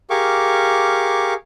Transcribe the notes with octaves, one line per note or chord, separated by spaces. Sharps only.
G4 G#4 A#4 F5 C#6 D6